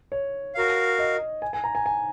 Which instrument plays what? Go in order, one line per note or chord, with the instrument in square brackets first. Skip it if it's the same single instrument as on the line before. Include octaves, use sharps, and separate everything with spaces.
[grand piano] C#5
[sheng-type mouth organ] F#4 A#4 F5
[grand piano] D#5
G#5
G#5
A#5
G#5
G#5